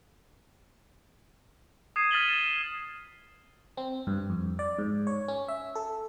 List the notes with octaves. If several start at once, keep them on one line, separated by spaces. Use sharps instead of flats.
D#6 G#6 C7 D#7 E7
F6 A6 B6 D#7 F#7 G7
E7
E7
C4
G2
F2
D5
G#2
C#5
C#4
E5
A4